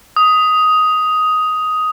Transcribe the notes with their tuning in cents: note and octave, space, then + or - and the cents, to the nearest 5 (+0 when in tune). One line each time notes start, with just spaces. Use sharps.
D#6 +10